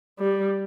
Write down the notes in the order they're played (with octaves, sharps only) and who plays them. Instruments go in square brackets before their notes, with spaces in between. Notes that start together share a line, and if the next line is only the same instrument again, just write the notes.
[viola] G3